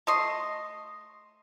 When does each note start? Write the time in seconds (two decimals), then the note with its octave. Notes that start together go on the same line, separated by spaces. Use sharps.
0.07 A3 D#5 C6